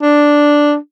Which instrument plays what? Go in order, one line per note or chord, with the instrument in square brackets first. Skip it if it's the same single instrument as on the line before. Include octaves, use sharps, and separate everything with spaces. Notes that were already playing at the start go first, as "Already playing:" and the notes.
[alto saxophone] D4